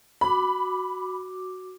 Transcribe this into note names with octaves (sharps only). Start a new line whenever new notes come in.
F#4 B5 D6